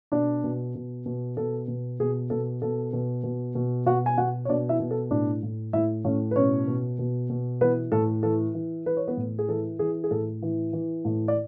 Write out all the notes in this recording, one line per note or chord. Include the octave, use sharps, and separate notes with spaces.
B2 D4 D5
B2
B2
B2
B2 A4
B2
B2 G#4
B2 A4
B2 A4
B2
B2
B2
B2 F#4 F#5
G#5
B2 F#4 F#5
C#5
B2 D4 D5
E4 E5
B2
A4
A2 D4 D5
A2
A2 E4 E5
A2 C#4 C#5
B4
B2 C#4 C#5
B2
B2
B2
E3 B3 B4
A2 A4
E3 A4
E3
E3 B4
C#5
B3 B4
A2
G#4
E3 A4
E3 G#4
G#4
A2 A4
E3
E3
A2
D5